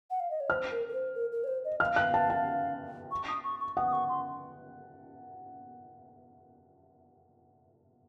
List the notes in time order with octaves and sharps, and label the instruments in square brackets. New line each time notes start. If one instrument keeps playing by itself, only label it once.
[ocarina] F#5
F5
D#5
C#5
[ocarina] C5 [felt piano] F6
[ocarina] A#4
A#4
C5
A#4
A#4
C#5
C5
D#5
[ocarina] F5 [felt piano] F6
[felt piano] F#6
A5
A5
[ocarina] C#6
D#6
C#6
C#6
[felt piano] F#5 [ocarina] D#6
[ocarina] D#6
C#6
C6